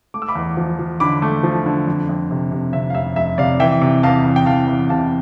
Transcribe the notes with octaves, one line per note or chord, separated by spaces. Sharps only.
A3 D6
E6
B5 D6
E2
F3
F3
D3 B5 D6
A3
F3
D3
F2
F2
C3
C3
C3 E5
F5
F1 E5
F1 E5
C3 D5 F5
E3 E5 G5
C3
E2 F5 A5
E2
G5
E2 F5 A5
E2
C3 F5 A5